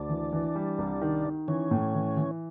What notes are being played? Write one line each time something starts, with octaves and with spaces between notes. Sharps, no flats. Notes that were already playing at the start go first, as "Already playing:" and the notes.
Already playing: D2 D4
E3
E3
G3
C2
D#3
D#3
E3 C#4
A2
E3
E3